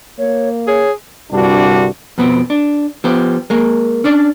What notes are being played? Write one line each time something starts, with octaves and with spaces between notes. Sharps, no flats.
A#3 C#5
G#4 C#5
C2 G2 D3 G3 D4 F#4
F2 B2 B3 C4
D4
F3 B3 G4
G#3 A#3
C#4 D4 D5